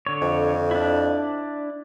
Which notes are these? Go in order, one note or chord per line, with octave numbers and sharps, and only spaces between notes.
D3 C#5
F2
D4 E4